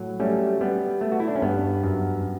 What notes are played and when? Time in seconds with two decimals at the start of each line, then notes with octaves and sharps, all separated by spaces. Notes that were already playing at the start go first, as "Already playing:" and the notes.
Already playing: A2 F#3
0.20 G3 A3 C#4
0.61 G3 B3
1.01 A3
1.12 F#4
1.20 E4
1.28 D4
1.35 C#4
1.42 G2 B3
1.83 F#2